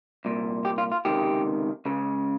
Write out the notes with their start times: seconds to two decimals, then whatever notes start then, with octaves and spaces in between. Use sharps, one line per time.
0.25 C2 A#2
0.65 G4
0.78 F4
0.92 F4
1.05 C#2 C3 D#3 G4
1.85 C#2 C#3